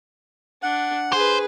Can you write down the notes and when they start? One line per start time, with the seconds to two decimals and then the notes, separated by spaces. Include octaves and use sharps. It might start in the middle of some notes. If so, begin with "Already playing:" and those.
0.63 D4 F#5
1.13 G#4 B4 C5